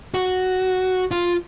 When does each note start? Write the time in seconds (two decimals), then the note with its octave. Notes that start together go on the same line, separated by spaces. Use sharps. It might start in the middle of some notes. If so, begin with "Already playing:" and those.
0.14 F#4
1.11 F4